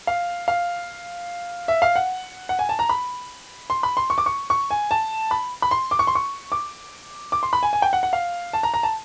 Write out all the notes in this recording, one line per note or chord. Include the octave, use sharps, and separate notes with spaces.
F5
F5
E5
F5
F#5
F#5
G#5
A5
A#5
B5
C6
B5
C6
C#6
D6
C#6
C#6
G#5
A5
B5
B5
C6
D6
C#6
C6
C#6
D6
D6
C6
B5
G#5
G#5
G5
F#5
F#5
F5
A5
A#5
A#5
A5